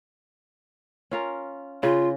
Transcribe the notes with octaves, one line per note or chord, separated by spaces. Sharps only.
C#4 F4 A#4
C#3 F4